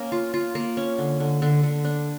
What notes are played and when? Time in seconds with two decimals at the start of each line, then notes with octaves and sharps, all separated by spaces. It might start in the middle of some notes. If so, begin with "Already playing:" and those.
Already playing: A#3 C#4
0.12 F4
0.34 F4
0.55 A#3
0.77 C#4
0.98 D3
1.20 D3
1.42 D3
1.63 D3
1.85 D4